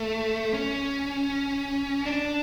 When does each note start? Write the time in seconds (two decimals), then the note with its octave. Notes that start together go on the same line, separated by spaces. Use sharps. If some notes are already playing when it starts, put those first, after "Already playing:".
Already playing: A3
0.54 C#4
2.05 D4